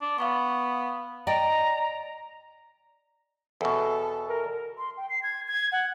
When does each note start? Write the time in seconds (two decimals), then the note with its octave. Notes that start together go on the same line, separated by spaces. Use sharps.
0.01 D4
0.18 B3 F5 B5 C#6
1.27 D5 D#5 G5 A#5
3.61 E2 B2 A4
4.28 A#4
4.78 C6
4.97 G5
5.10 C7
5.23 G#6
5.48 G#6
5.72 F#5